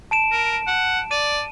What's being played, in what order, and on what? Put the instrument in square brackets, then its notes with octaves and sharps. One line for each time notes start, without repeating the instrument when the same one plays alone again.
[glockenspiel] A5 D7 E7
[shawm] A#4
F#5
[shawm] D5 [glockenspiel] D#7